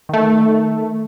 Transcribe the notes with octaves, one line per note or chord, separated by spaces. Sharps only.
D#3 A3